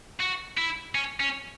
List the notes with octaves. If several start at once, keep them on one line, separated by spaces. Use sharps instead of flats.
F#4
E4
C#4
C#4